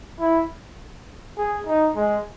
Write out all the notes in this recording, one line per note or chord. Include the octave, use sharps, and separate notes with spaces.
E4
G#4
D#4
G#3